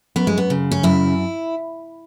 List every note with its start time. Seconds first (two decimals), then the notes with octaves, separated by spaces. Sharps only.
0.16 F#2 B3
0.27 G#3
0.37 B3
0.50 C#3
0.71 C#4
0.83 F#2 E4